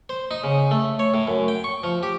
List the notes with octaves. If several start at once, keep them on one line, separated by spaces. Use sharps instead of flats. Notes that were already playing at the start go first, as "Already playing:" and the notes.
C5
D#4
C#3
A3
C#5
A2
F#2
G5
C#6
F3
G4